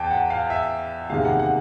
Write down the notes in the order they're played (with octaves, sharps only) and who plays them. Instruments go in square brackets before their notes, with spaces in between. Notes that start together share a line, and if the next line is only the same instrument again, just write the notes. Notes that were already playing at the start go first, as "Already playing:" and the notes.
Already playing: [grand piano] E2 G5 A5
F#5
F5
E5
F#1 E2 C3 D#3 G#3 F5
F#5
F#5